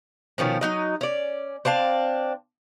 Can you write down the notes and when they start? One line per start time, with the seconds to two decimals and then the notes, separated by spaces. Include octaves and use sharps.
0.38 B2 D#3 F3 C#4
0.61 F#3 D#4 D#5
1.01 C#4 D5
1.65 C4 D4 F5 A5